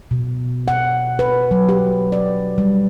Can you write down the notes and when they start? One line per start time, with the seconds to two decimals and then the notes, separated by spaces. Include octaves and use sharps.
0.11 B2
0.68 F#5
1.19 B4
1.51 F#3
1.69 G4
2.12 D5
2.58 G3